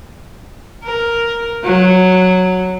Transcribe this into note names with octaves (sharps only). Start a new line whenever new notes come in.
A#4
F#3